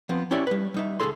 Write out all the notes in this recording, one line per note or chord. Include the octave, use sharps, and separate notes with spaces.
F3 B3 C4
C#4 E4 G4 C#5 D5 E5
G3 B4
G3 D#4 E5
C#2 C#3 G#4 A4 C6